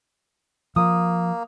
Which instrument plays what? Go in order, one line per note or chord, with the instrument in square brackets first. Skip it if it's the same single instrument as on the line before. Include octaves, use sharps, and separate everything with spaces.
[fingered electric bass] F3 [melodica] A#3 [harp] D#6